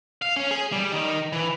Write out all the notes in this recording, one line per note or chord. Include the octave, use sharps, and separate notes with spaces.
F5
C#4
G#4
G3
D#3
E3